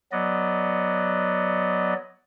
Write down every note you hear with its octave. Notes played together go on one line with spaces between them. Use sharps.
F#3 B3 D5 D#5